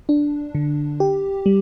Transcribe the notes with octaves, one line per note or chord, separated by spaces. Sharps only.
D4
D3
G4
G3